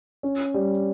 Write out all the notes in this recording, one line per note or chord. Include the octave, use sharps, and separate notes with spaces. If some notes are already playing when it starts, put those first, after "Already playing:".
C#4
G3